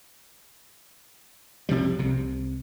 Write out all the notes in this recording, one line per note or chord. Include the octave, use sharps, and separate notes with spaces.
B1 C3 F3 G3
C2 C3